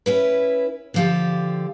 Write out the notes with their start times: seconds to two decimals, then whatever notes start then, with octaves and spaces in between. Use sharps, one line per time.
0.06 C#4 E4 B4
0.94 D3 F3 G4